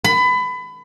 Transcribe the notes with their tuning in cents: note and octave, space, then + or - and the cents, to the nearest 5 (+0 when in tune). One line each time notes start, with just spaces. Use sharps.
B5 +25